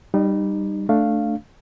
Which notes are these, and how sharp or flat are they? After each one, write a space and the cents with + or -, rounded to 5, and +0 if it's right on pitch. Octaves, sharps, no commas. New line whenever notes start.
G3 +0 D#4 -30
A3 +0 D4 +0 F5 +0